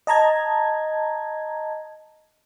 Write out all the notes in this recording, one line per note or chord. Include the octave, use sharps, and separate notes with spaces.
D#5 A5 A#5 G#6